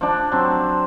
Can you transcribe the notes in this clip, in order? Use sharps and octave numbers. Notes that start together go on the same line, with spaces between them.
F3 D4
F#3 C4